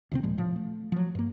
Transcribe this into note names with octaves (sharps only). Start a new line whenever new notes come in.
D2 C3 C4
D#2 A#2 F3 G#3
A2 F3
A3
F3 F#3
G2 A#3